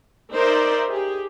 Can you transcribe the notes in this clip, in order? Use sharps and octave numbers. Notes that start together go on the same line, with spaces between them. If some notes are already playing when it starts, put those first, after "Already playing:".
D#4 A#4 C5 D5 E5
G4 G#4